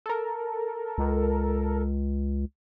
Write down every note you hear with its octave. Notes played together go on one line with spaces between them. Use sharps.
A4 A#4
C#2